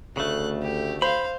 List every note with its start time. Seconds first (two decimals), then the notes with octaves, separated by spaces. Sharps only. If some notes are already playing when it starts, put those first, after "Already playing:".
0.17 D2 C#3 A3 F#6
0.62 G4
1.02 C5 F5 B5